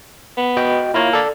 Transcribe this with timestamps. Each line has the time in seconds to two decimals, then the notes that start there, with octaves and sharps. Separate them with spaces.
0.37 B3
0.57 F#4 D#5 G5
0.94 A#3 E4 F4 C#5
1.13 A4 D5